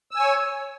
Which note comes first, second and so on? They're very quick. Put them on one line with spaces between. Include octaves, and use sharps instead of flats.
E6 G#5 C#5